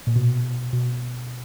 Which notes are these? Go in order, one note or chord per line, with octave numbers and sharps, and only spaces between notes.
A#2
B2
B2